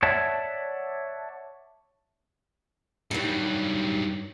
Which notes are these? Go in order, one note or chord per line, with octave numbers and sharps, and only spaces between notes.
C#5 D5 E5 F#5 A5
G2 D#3 F#3 G3